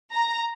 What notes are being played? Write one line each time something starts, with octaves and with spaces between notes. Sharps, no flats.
A#5